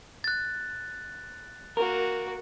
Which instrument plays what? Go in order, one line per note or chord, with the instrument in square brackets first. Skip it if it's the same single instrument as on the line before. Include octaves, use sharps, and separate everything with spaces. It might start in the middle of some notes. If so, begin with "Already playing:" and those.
[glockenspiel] F#6 A6
[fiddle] A#3 F#4 [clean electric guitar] A#4